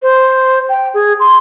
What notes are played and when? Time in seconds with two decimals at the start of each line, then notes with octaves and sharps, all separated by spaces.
0.02 C5
0.69 G5
0.94 G#4
1.20 C6